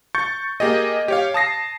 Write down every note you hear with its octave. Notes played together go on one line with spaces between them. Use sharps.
C#6 G6 A6 C#7
A#3 G4 G#4 D#5
G4 C#5 F5
A5 D#6 A#6 C7